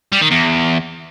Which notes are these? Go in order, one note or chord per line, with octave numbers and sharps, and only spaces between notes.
G3
D#3
E2